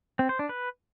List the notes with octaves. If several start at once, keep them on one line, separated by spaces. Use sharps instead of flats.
C4
C5
D4
B4